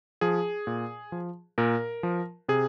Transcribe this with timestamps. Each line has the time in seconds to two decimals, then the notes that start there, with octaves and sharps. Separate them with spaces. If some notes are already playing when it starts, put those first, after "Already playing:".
0.21 F3 G#4
0.67 A#2
1.12 F3
1.58 A#2 A#4
2.03 F3
2.48 C3 G#4